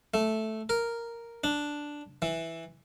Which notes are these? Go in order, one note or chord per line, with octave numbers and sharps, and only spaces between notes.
A3
A#4
D4
E3